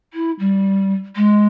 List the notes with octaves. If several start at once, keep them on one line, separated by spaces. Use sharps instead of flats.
E4
G3
G#3